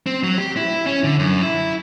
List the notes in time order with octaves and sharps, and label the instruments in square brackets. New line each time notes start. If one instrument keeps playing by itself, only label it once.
[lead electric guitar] C4
F#3
G4
E4
C#4
D3
F#2
E4